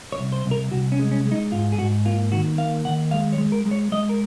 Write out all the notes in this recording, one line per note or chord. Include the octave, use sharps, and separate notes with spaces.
C#5
C2
C5
C2
A#4
C2 F#4
C#4
G#3
C#4
G#3
D#4
G#2 F4
G#4
G#2 F#4
A#3 F4
D#3 F#4
A#3 F5
D#3 F#5
G#3 F5
C#5
G#3
A#4
G#3
C#5
G#3 D#5
A#4